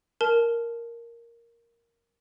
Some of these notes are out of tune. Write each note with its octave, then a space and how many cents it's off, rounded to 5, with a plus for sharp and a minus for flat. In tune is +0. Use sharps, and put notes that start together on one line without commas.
A#4 +0 A5 -20